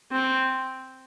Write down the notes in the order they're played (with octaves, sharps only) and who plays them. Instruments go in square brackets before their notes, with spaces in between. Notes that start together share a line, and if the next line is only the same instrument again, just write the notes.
[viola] C4